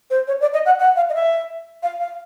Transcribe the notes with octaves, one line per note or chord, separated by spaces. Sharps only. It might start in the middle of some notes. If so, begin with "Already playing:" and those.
C5
C#5
D5
D#5
F#5
F#5
F5
D#5
E5
F5
F5